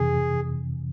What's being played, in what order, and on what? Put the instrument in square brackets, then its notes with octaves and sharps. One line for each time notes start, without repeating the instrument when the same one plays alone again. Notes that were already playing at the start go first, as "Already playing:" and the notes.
Already playing: [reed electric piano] F2 C3 E3 [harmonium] G#4